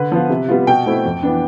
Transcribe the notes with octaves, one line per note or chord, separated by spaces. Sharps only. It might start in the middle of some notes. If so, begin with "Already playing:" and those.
Already playing: D3 B4
F3 B3 F4
C3
G3 B3 F4
B2 G5
A3 C4 E4
F2
E3 B3 D4